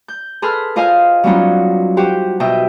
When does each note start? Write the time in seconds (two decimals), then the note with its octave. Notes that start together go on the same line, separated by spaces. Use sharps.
0.08 G6
0.42 G#4 A4 B4 C6 F6
0.76 F4 C5 D#5 F5 G#5 F6
1.24 F#3 G3 B3 C#4 D#4 F4
1.97 F#4 G4 C5 G5
2.40 B2 D#5 E5 G5